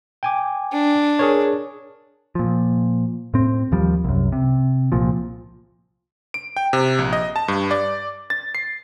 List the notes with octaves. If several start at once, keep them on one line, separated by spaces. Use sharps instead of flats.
G5 G#5 D6
D4
G#4 A#4 C#5
A#2 F3
A2 C4
D#2 F3 G3
C2 F#2
C3
C2 A#2 F3
D7
G5
C3
A#1
D#5
A5
G2
D5
A6
C7